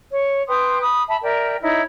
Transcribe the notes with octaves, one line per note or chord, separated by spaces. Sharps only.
C#5
B4 G5 C6 D#6
B5 D#6
E5 A5 B5
A#4 D5 E5 G5
D#4 E4 C#5 D#5